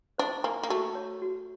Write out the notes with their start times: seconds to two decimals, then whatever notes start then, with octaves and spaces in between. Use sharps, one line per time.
0.18 D4 C5
0.44 A#3 G#5
0.63 A#3
0.70 A3 F#4
0.95 C#5
1.22 F#4